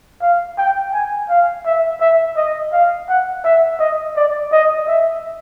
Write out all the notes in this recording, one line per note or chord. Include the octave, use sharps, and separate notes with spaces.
F5
G5
G#5
F5
E5
E5
D#5
F5
F#5
E5
D#5
D5
D#5
E5